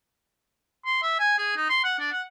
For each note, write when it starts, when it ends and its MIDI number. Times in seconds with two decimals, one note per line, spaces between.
0.86 1.03 84
1.03 1.17 76
1.19 1.38 80
1.38 1.53 68
1.56 1.65 63
1.69 1.79 84
1.84 1.96 78
1.99 2.09 62
2.12 2.22 78